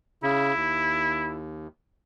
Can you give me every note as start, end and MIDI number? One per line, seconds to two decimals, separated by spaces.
0.23 0.54 49
0.23 1.40 64
0.56 1.67 39